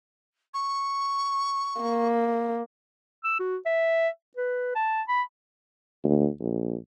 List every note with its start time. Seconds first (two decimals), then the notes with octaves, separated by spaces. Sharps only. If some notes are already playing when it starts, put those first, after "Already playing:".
0.54 C#6
1.82 A#3
3.24 E6
3.40 F#4
3.66 E5
4.37 B4
4.75 A5
5.08 B5
6.04 D2
6.40 A#1